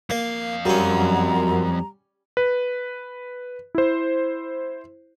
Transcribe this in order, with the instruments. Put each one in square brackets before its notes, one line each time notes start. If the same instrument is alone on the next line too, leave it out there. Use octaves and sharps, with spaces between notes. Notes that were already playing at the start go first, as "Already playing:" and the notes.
[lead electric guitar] F2 F5 [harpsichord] A#3
[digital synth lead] F#2 [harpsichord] G3 C#4 [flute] A#5
[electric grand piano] B4
E4 C5